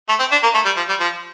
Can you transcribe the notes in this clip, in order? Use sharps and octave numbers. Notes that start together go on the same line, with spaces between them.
A3
C4
D4
A#3
A3
G3
F3
G3
F3